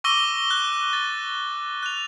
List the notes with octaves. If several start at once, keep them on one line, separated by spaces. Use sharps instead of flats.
C#6 D6 E6 A#6 D#7 G7
F#6
A6
F#6 F7